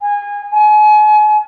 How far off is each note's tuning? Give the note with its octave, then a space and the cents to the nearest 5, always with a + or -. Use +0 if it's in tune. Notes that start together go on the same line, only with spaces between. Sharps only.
G#5 -25
G#5 +35